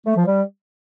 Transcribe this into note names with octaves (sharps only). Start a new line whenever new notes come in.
A3
F3
G3